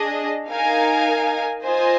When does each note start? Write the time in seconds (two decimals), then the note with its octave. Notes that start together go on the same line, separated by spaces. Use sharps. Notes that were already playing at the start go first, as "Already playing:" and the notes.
Already playing: D4 G#4 D#5
0.49 D#4 A#4 F5 G#5
1.64 F4 C5 D#5 G#5